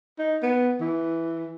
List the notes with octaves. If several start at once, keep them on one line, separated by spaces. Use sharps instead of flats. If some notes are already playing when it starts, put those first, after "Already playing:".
D#4
B3
E3